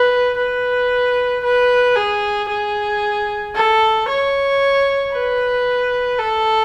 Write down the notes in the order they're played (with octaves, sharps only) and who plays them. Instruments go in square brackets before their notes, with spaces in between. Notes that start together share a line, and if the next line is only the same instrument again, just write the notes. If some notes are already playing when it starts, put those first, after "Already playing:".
Already playing: [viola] B4
B4
B4
G#4
G#4
A4
C#5
B4
A4